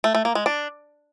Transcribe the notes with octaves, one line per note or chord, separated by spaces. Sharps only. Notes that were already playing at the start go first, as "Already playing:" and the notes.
A3
A3
A#3
G#3
D4